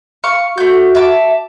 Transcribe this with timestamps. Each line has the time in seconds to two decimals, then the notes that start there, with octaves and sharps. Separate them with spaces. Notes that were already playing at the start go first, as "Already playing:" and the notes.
0.24 F5 C#6
0.58 A3 F#4 G6
0.95 E5 A5 D6